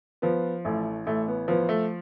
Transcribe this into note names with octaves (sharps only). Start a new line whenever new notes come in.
F3 B3
A1 A3
A1 A3
B3
F3 B3
A3